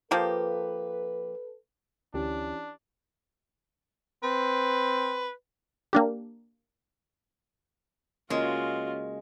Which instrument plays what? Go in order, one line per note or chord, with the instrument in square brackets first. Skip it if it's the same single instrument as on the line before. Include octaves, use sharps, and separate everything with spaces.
[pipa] F3 A#3 G4 [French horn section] A4 B4
[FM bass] D2 [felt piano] E3 C#4 G4 [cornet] D4
[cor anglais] C4 [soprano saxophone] B4
[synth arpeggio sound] A#3 D4 G4
[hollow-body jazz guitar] C#3 A#3 [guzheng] G#3 [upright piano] C#4 [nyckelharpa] F4 F#4